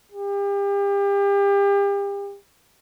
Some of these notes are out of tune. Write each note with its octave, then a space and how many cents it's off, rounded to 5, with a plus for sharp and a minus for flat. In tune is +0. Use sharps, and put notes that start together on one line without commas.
G4 +35